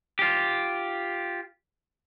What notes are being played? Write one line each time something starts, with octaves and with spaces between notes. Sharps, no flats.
F4 G4